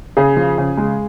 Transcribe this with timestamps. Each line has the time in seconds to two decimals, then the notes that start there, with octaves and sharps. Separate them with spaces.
0.17 C#3 G#4
0.37 F3
0.58 C#3
0.77 G#3